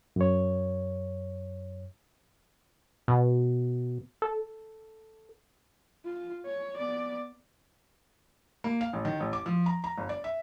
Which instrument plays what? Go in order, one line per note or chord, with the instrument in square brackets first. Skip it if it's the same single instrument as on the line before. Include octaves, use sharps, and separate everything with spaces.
[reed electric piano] F#2 C#5
[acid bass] B2
A4
[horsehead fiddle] F4
C#5
B3 D5
[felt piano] A#3
F5
A1
D#3
A1
D6
F3
A#5
A#5
G1
D5
E5